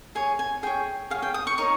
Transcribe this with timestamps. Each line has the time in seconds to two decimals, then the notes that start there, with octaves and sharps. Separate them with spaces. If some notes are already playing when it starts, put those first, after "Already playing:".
0.15 G#4 C#5 G#5
0.39 G#5
0.63 G#4 C#5 G5
1.10 G#4 F5
1.14 C#5
1.22 G5
1.34 D#6
1.47 C#6
1.58 D#4 A#4 C#5 C#6